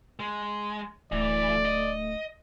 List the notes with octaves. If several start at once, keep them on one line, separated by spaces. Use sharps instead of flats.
G#3
D1 E3 A3 D5
D#5